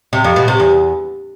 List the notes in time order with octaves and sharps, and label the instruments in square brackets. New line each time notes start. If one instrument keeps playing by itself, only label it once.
[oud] C3
F2
B2
C3
E2